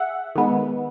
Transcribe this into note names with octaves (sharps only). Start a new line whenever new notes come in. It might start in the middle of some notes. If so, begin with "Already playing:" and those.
Already playing: G#4 E5 F#5
D#3 G#3 B3